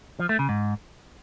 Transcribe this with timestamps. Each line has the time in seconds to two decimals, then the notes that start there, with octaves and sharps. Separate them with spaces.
0.20 F3
0.29 A3
0.39 C#3
0.49 G#2